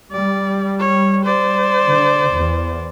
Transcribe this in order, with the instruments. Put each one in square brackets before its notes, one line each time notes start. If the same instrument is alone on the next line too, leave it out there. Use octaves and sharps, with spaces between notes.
[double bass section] G3 [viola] D5
[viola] C#5
C5 D5
[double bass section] D3
E2